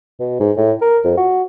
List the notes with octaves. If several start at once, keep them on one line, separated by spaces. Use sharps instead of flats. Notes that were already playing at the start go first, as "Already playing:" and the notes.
B2
G#2
A2
A#4
F2
F#4